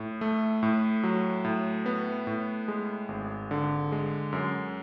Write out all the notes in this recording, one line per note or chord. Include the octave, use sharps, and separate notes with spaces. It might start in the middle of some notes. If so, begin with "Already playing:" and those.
Already playing: A2
A3
A2
F#3
A2
B3
A2
G#3
G#1
D3
G#3
F#2